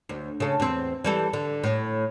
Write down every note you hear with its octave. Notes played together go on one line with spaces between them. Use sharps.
D2
C#3 A4
E2 C4
E3 G3 A4
D3
A2